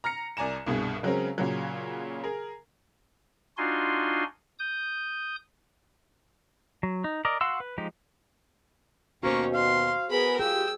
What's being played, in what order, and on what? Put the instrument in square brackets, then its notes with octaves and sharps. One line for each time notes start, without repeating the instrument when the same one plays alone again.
[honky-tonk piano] A#5 F6 A#6 C#7
C2 D5 G#5 A#5 E7
C2 G2 B2 G#4
C#3 F#3 G#3 C4 C#4 A#4
A#2 C#3 F#3
G#4 A#4
[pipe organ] D4 D#4 F4 F#4 G#5 C6
D#6 G6
[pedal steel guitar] F#3
D#4
A#4 D5 D#5
F#4 F5 F#5 C6 E6
B4
F3 G#3 D#4 G4
[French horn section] D#2 B2 [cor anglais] A#3 [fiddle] C#4 C#6 [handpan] F#4 C5
[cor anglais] F5 [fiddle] C6
[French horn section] B3 G#4 B4 [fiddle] A#4 B5
[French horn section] F4 G4 [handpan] G#4 [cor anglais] G5 [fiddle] E6